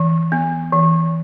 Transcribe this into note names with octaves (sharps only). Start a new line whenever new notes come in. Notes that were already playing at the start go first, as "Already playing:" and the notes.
Already playing: E3
B3
E3